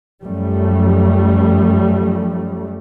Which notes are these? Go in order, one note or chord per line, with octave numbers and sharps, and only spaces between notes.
F#2 F3 G3 A3